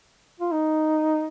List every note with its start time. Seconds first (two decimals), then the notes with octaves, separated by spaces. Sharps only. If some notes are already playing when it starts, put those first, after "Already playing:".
0.40 F4
0.52 D#4